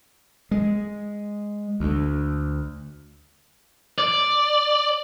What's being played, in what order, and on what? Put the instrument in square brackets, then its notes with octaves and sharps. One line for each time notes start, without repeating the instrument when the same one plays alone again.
[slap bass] G#3
D2
[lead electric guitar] D5